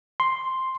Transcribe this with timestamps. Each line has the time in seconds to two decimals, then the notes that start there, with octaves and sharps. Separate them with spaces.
0.20 C6